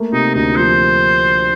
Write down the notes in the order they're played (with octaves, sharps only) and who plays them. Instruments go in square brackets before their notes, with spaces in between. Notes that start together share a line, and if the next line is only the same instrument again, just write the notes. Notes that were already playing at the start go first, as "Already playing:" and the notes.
Already playing: [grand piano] A3 A#3
[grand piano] C3 [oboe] D#4
[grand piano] D2 [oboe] D#4
[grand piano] F3 [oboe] C5